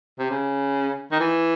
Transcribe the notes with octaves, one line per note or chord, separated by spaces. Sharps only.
C3
C#3
D#3
E3